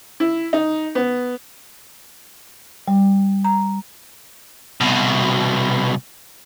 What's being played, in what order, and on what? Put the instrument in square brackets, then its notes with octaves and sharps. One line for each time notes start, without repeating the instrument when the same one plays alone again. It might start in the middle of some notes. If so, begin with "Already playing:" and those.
[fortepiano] E4
D#4
B3
[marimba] G3
A#5
[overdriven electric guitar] C2 B2